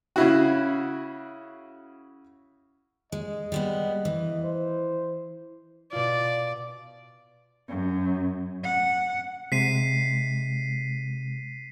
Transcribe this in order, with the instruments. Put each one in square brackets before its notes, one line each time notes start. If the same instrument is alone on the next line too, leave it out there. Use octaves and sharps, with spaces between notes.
[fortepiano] C#3 E4 F#4
[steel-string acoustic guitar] G#3 [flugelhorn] D#5
[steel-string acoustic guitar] G3 G#3 B3
E3
[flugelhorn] C5
[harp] B2 F4 [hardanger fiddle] D5
[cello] F#2
F#5
[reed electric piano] C3 G#3 [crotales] B6 C7 D#7